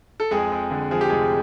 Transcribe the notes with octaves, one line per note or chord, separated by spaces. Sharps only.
A4
F2 G#3 G#4
F2
D3
F3 G#4
G4
F1 G#3 G#4